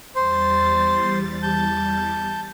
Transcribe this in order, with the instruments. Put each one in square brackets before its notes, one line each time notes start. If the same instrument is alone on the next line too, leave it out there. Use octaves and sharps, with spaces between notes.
[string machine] E2 G3 A6 [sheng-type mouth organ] C5 C6
[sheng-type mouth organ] A5 G6